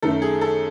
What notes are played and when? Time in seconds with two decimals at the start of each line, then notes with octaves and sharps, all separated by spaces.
0.02 F#2 D#3 A3 A4
0.22 G#4
0.41 A4